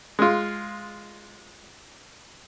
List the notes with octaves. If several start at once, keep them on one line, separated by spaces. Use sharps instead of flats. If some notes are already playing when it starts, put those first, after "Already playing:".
G#3 F4